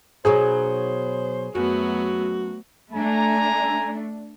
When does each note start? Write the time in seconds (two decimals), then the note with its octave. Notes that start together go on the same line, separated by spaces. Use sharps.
0.25 B2 F#3 D#4 G#4 C5
1.55 F#2 F#3 A3 B3 F#4
2.92 A3 D4 G#5 A#5